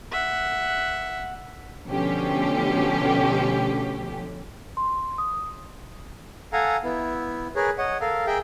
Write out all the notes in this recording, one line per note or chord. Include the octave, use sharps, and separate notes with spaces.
E5 F#5
B2 D3 F3 A3 C#4 G4
C6
D#6
A4 F5 F#5 G#5 A#5
B3 E4
G#4 A#4 B4 C#5
C#5 D#5 F#5
A4 A#4 F5
G#4 A#4 E5 G5